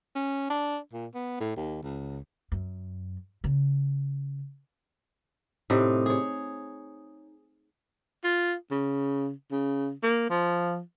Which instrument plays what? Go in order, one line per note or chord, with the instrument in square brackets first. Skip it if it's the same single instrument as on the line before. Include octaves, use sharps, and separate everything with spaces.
[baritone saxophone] C#4
D4
A#2
B3
A2
D#2
C#2
[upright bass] F#2
C#3
[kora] A2 C3 D#4
G#4 C#5
[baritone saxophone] F4
C#3
C#3
A#3
F3